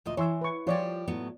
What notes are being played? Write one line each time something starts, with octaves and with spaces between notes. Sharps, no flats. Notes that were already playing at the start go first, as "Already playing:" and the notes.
D2 A#2 D#5
E3 C#5 C6 E6
B4 C#6
F3 G3 F4 G4 C#5 D5
A2 F#3 B3